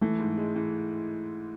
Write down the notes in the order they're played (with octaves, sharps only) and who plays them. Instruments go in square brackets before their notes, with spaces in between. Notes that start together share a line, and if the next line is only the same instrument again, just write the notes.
[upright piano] E3 [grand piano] A3
[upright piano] G#2
G#3
E3